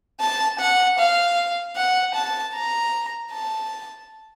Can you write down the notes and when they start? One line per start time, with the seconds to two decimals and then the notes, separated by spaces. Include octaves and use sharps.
0.20 A5
0.60 F#5
0.99 F5
1.76 F#5
2.15 A5
2.55 A#5
3.31 A5